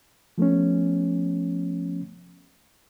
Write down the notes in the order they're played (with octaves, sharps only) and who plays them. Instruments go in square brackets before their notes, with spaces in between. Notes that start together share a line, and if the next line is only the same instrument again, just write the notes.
[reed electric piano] F3 A3 B3 C#4